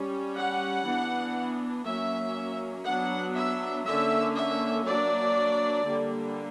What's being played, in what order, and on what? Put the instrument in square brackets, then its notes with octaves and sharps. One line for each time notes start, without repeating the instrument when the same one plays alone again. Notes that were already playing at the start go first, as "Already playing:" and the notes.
Already playing: [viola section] G3 C#4
F#5
E3 B3 D4
F#3 A#3 C#4 E5
F#3 B3 D4 F#5
E5
D3 A#3 C#4 E5
E5
F#3 A#3 D4 D5
D3 G3 A#3